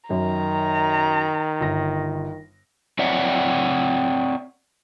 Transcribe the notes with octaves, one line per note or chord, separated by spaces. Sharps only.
F#2 D#3 A#5
G1 A#6
C4 C#5 D5 E5 F#5